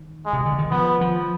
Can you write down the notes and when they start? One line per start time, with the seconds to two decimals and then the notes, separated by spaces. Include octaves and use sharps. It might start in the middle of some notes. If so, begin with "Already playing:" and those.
Already playing: D#3
0.26 G#3
0.33 C3
0.46 D3
0.58 D#3
0.71 F3 B3
1.01 F3